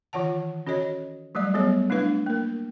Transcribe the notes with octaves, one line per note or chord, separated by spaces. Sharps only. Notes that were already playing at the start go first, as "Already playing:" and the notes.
D#3 E3 F4 C#5 F#5 A5
C#4 F#4 A4 C#5 D#5
F#3 G3 A3 D5
F#3 G3 B3 G#4 A4 C#5
A3 D4 E4 B4 F5
A#3 A#4